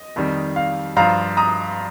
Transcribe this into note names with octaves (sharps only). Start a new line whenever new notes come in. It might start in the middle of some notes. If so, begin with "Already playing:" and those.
Already playing: D#5
F2 D#3 G3
F5
G2 F3 F5 A#5
A#5 D#6